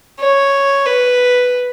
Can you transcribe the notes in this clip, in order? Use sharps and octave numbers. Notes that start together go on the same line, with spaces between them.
C#5
B4